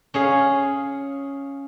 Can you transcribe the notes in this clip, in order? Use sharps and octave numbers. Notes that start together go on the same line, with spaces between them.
C#4 G#4 F5